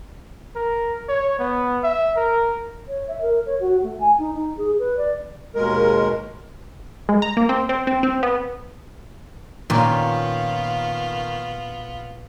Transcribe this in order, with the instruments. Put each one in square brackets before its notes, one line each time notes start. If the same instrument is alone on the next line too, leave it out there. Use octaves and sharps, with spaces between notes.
[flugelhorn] A#4
C#5
B3
E5
A#4
[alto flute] C#5
E5
A#4
C#5
F#4
A3
G#5
D#4
D#4
G#4
B4
D5
[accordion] D#2 B2 G#3 A#4
[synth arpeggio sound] G#3
A#5
A#3
C4
C4
C4
C4
B3
[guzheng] A#2 [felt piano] D#3 A#3 C#4 [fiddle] B3 F4